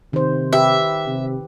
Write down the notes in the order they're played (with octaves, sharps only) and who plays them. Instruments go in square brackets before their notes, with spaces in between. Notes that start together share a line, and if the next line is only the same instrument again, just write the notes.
[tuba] C3 [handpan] D#3 C5
[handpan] G4 B4 [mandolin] E5
[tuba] C3